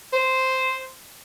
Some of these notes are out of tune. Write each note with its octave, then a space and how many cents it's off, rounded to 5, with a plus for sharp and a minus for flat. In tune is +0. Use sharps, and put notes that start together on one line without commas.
C5 -5